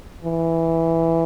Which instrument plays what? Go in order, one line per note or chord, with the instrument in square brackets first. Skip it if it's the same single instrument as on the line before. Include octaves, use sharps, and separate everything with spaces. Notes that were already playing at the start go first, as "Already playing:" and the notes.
[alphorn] E3